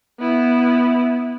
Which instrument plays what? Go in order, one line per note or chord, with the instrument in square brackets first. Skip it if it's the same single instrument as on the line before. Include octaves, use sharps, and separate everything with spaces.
[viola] B3 E4